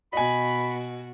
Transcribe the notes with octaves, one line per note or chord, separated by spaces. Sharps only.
B2 F#4 D#5 G#5 B5